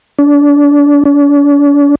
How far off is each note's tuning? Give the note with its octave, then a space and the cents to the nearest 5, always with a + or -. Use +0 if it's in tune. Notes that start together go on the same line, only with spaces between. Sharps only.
D4 -30
D4 -45